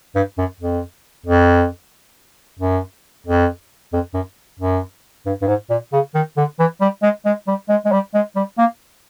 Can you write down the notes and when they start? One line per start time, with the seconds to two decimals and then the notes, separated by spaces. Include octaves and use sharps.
0.15 G2
0.38 F#2
0.60 F2
1.26 F2
2.59 F#2
3.26 F2
3.93 F2
4.14 F#2
4.59 F#2
5.26 G2
5.41 G2
5.47 G#2
5.70 A#2
5.93 C#3
6.14 D#3
6.37 D3
6.59 E3
6.81 G3
7.02 G#3
7.25 G#3
7.47 G3
7.69 G#3
7.85 G#3
7.92 G3
8.14 G#3
8.36 G3
8.58 A#3